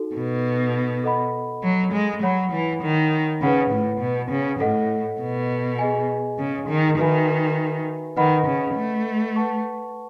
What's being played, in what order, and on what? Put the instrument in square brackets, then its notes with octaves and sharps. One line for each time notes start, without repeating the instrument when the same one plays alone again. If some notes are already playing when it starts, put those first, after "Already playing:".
Already playing: [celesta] D#4 F#4 A4
[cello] B2
[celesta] A4 D#5 F#5 B5
[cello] F#3
G#3
[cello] F#3 [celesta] C#5 F#5 B5
[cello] E3
D#3
[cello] C#3 [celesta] B4 F#5 B5
[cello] A2
B2
C#3
[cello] A2 [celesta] A4 D#5 F#5
[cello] B2
[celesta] G#4 D#5 G#5
[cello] C#3
D#3
[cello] D#3 [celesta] F#4 B4 E5 G#5 B5
[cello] D#3 [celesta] B4 D#5 F#5 B5
[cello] C#3
A3
[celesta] B4 F#5 A5 C#6